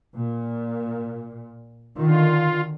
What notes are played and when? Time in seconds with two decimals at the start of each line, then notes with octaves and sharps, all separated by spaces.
0.16 A#2
1.98 D3 D#3 F4